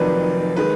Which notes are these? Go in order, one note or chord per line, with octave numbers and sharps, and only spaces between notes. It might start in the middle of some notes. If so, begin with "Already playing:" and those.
Already playing: F1 F2 D#3 F#3 B4 D5
D#3 G#3 B4